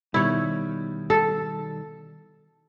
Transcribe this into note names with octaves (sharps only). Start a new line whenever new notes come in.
B2 D#3 G3 E4 C#5
A4